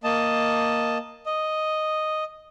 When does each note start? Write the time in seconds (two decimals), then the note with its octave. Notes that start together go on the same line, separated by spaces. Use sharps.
0.04 A#3 D#5 A5
1.26 D#5